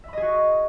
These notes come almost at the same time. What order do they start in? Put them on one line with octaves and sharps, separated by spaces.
E5 B5 D#5 G#4 F#4